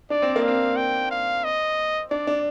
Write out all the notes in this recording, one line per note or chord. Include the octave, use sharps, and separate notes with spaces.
D4 D5
C4
A#3
C4 F5
G5
F5
D#5
D4 D5
D4